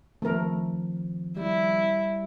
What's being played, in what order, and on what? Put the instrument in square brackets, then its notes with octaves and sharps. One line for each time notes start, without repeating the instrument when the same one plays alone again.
[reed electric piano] D#3 F3 C4 [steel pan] A3 A#4
[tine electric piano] G3 [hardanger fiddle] E4